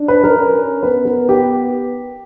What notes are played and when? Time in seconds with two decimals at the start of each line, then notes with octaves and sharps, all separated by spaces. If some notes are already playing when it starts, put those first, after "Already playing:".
Already playing: D4
0.08 B4
0.24 A#4
0.38 C#4
0.83 B3 B4
1.05 A#4
1.29 G4